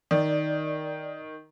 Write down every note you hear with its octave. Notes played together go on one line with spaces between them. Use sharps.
D#3 D5